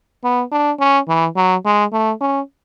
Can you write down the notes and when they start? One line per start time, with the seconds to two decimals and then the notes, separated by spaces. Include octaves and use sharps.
0.24 B3
0.52 D4
0.80 C#4
1.08 E3
1.36 F#3
1.65 G#3
1.93 A3
2.21 C#4